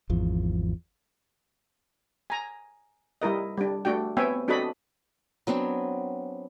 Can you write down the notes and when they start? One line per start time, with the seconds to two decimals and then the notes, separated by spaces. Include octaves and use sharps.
0.10 G#1 E2 F3
2.30 G#5 A#5
3.21 G3 E4 A#4 D#5
3.57 G3 D4
3.85 A3 D4 F#4 G5
4.17 B3 C4 C#5 E5 G5 G#5
4.48 C4 D4 F#4 A4 D#5 B5
5.47 F#3 B3 C4 D4